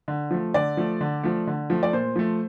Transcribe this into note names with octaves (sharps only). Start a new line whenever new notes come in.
D3
F3 A3
D3 D5
F3 A3
D3
F3 A3
D3
F3 A3
D5
A#2 C5
F3 A3